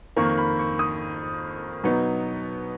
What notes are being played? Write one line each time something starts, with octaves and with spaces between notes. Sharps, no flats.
F2 D#3 A#3 C#6
B5
C#6
D#6
B2 F#3 B3 D#4